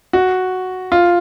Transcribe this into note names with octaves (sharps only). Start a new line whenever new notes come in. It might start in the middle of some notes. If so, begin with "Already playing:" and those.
F#4
F4